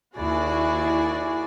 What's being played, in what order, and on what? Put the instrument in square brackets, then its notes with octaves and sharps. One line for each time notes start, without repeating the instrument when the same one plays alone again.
[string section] D#2 E4 F#4 G#4 D5